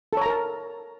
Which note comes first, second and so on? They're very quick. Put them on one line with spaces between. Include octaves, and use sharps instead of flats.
A4 C#5 A#5 A#4 A5